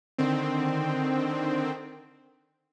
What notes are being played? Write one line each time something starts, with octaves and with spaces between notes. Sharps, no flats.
D3 D#3 C4